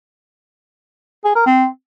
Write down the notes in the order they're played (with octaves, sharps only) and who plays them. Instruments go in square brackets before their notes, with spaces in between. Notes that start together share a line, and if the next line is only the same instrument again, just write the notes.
[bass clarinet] G#4
A#4
C4